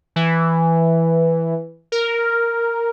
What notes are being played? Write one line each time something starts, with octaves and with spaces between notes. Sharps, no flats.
E3
A#4